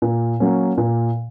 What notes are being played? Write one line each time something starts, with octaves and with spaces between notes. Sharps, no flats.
A#2
F#3 A#3 C#4
A#2